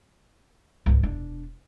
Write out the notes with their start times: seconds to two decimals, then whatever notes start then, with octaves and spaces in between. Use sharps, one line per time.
0.86 C#2 G#2
1.03 E1 D4